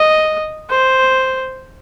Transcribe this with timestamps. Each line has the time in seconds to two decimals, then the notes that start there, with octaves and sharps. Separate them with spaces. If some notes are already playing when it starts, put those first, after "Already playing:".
Already playing: D#5
0.70 C5